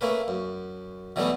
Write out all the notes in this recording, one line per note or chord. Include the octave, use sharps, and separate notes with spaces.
A3 A#3 C#4 B4
F#2
B2 E3 F#3 G3 A3 B3